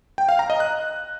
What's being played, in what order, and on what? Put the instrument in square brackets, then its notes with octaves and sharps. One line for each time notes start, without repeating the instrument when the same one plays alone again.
[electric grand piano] G5
F5
A#5
D#5
F#6